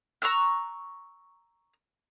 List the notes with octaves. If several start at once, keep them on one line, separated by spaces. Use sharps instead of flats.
A#5 C#6 E6 F#6